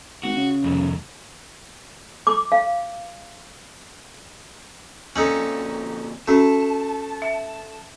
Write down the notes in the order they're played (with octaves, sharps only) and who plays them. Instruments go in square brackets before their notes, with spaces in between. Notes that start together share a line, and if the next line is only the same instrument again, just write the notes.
[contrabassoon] G#1 [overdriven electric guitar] F#4
[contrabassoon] C#3
[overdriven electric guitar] C2 F2
[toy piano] D6
F5
[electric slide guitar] A#2 C4 [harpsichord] C#4 D#4 A4 [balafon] G#5
[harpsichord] A3 [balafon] C#4 F#4 [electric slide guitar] A5
[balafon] E5